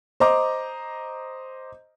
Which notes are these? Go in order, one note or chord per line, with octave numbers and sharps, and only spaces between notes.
C5 D#5 A#5 D6